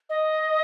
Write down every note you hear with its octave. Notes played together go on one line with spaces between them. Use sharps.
D#5